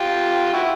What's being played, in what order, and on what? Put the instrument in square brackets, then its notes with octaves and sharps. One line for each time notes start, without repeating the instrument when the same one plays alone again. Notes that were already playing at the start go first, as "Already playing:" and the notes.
Already playing: [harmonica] F4 G4
E4 F#4